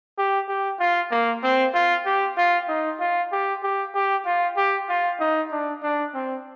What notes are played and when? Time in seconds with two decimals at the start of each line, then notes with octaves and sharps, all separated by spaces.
0.18 G4
0.49 G4
0.80 F4
1.11 A#3
1.43 C4
1.74 F4
2.06 G4
2.37 F4
2.69 D#4
3.00 F4
3.32 G4
3.63 G4
3.95 G4
4.26 F4
4.57 G4
4.89 F4
5.20 D#4
5.51 D4
5.83 D4
6.14 C4